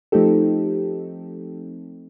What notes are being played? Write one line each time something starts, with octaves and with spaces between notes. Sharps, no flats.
F3 A3 C4 D#4 G4 A4